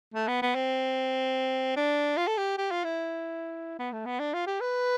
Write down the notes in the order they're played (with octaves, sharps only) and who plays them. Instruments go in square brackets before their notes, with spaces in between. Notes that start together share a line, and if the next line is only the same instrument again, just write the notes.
[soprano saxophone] A3
B3
B3
C4
D4
F4
A4
G4
G4
F4
E4
B3
A3
B3
D4
F4
G4
B4